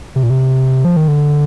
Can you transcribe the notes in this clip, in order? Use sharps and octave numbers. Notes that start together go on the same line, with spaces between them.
C3
A#2
C3
F3
D#3
D3